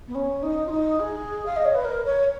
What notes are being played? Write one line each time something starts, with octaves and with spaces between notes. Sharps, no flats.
B3
C#4
D#4
F4
D#4
G#4
F5
D#5
C#5
B4
A#4
C#5